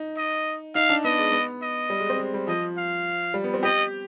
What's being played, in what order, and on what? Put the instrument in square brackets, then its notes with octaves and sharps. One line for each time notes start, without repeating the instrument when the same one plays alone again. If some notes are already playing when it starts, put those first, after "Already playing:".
Already playing: [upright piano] D#4
[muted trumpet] D#5
[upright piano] D#4 [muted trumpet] F5
[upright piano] D4
[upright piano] B3 [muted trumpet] D#5
[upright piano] G#3
B3
[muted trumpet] D#5
[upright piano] G3
G#3
C4
G#3
G3
[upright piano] F3 [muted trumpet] D#5
[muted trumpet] F5
[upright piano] G3
B3
C4
[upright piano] G4 [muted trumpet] D#5